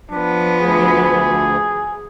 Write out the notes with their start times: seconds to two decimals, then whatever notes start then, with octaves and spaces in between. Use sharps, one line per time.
0.11 F3 B3 D4
0.60 D2 G#4